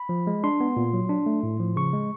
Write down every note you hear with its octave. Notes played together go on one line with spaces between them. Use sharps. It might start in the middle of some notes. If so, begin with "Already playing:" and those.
Already playing: B5
F3
G#3
D4 C6
B3
A#2
F#3
D4
A3
A2
F3
C#3 C#6
G#3